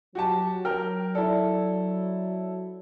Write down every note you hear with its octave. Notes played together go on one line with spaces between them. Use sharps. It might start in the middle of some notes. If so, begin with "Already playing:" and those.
F#3 F#4 G4 A5
A#4 G5 F6
E4 A4 D5